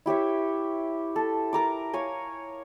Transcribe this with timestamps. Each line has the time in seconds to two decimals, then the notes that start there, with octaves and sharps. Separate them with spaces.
0.06 E4 G4 C#5 E5
1.16 A4
1.53 A#4 A#5 D6
1.93 C#5 F5 G#5